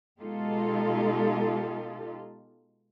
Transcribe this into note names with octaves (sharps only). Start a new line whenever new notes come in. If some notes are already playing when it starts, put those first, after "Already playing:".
B2 G#3 D#4 F4 G4 A4